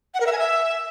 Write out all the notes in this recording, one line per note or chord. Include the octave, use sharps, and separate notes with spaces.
F#5
A#4
E5
G#5
E5